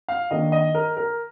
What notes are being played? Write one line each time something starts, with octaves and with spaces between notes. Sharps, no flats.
F5
D#3 A#3 D4 D#5
D#5
A#4
A#4